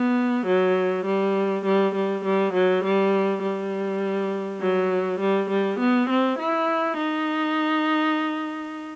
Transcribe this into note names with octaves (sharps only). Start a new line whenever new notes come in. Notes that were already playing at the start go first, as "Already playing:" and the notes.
Already playing: B3
F#3
G3
G3
G3
G3
F#3
G3
G3
F#3
G3
G3
B3
C4
E4
D#4